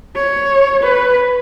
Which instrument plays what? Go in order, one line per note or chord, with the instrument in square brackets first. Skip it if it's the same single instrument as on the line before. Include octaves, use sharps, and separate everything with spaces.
[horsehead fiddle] C#5
B4